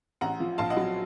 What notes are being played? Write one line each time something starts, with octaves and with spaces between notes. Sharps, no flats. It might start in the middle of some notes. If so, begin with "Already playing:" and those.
A1 F#5 A#5
F3
A#1 F5 A5
D#5 F#5
F#3